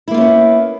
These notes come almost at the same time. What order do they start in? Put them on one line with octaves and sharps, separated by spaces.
E4 A#3 F4 C#4 B3